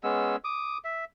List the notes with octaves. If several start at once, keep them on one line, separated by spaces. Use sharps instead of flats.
G#3 B3 C#4 E6
D6 D#6
E5